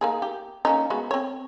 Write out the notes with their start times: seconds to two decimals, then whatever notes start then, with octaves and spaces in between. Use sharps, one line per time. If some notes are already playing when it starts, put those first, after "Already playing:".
0.01 A#3 D#4 G#4
0.22 G4
0.65 A#3 C#4 D#4
0.90 G#3 B3 F#4
1.11 C4 C#5